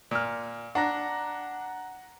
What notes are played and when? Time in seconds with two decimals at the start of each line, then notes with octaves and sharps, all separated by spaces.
0.11 A#2 F6
0.75 D4 F#5 A#5 A#6